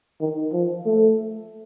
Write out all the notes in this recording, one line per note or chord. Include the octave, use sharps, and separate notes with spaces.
D#3
F3
A3